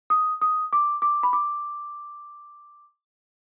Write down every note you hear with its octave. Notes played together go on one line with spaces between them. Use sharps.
D#6
D#6
D6
D6
B5
D6